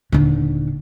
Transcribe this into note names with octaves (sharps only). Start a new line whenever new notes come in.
D#1 D3